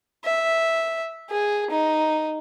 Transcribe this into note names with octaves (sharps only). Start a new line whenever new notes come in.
E5
G#4
D#4